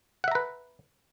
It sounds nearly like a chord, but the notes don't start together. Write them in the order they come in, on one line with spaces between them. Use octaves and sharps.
F#5 E5 A#5 B4